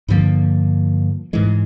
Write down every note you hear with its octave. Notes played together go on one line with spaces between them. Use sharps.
G2 D3 F3 A#3
G#2 E3 G#3